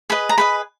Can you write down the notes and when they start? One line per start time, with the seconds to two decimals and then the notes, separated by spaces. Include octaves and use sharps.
0.10 G#4 B4 D#5 B5
0.29 A#5
0.38 G#4 B4 D#5 B5